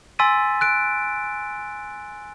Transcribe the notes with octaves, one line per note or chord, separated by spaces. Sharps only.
G#5 C6 E6 A6 B6 D#7
F#6 D7